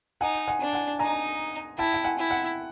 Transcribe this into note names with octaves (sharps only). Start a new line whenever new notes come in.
D#4 F#5 G#5
F#5 G#5
D4
F#5 G#5
D#4 G#5 A#5
E4 G5 A5
G5
F#5 G#5
E4
F#5